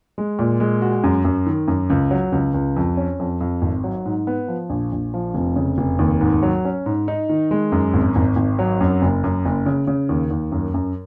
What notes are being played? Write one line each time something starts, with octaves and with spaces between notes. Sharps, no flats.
G#3
A#2
G#3
F#4
F#2
F#2
D#3
F#2
C#2
F#3
C#2
C#2
F2
C#4
F2
F2
G#1
F#3
G#2
B3
F3
A#1
A#1
F3
F1
C#3
F1
D#2
G#2
F#3
C#4
G#2
D#4
D#3
G#3
F#2
G#1
G#1
G#1
F#3
F#2
F#1
F#2
F#1
C#3
C#3
D#2
D#2
F#2
F#2